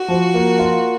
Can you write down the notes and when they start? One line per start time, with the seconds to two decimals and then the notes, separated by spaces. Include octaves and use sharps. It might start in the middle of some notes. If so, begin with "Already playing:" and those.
Already playing: F#4
0.08 F3
0.34 A#3
0.59 F4